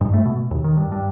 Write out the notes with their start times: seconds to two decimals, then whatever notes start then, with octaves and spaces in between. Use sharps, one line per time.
0.01 G2
0.13 A3
0.25 B2
0.51 D#2
0.64 D#3
0.77 G2
0.92 G2